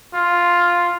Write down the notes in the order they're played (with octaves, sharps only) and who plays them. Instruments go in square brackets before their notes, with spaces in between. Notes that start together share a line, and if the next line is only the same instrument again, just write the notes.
[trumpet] F4